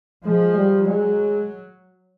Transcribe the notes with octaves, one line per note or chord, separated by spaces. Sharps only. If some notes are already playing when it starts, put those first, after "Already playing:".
F3 G#3
G3
F#3 G#3